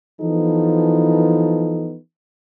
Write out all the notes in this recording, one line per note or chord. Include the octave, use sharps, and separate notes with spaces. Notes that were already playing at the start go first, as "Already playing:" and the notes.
E3 F3 B3 D#4 A4